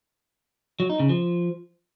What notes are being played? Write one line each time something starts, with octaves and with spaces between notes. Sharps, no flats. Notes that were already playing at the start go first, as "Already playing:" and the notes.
F#3
D#4
C#3
F3